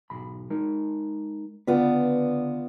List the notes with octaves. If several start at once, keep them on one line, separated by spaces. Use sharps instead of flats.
B1 G#2 B5
G#3 D#4 A#4
C#2 D3 B3 F4 B4 D5